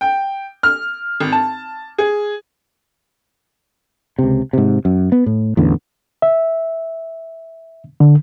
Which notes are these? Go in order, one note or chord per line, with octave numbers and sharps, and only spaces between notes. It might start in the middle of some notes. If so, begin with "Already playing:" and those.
G5
F6
G#1
A5
G#4
C#2 C3
G#2 C3
F#2
B3
A2
A1 E2 D3 B3
E5
D3